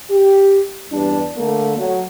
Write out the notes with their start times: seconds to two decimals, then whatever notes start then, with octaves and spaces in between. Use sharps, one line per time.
0.10 G4
0.92 E2 G2 G3 D4
1.37 D3 A3 A#3
1.78 F#3 A3